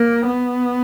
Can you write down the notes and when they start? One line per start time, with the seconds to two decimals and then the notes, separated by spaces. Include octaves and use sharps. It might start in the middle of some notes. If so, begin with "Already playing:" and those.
Already playing: A#3
0.27 B3